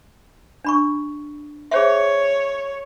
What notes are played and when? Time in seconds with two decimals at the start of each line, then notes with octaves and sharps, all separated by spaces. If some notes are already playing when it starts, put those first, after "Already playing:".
0.65 D4 B5 C#6
1.71 G#4 C5 C#5 E5